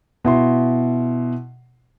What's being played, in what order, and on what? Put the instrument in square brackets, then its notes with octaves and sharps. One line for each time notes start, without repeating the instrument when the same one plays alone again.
[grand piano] B2 E4 C6